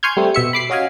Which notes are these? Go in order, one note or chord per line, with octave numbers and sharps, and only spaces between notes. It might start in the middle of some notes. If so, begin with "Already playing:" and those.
G#5 C6 C#6 F6 G6 G#6
G3 A3 C4
B2 E5 C#7
B5 D6 C7
C#4 F#4 D#5 F5 G#5